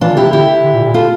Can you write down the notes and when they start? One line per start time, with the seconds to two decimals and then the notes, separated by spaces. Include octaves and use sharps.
0.01 E3 D4 F4
0.11 D3
0.17 C3 E4 G4
0.29 D3 E4 G4
0.64 D3
0.73 A#2
0.84 A#2
0.94 F4 A4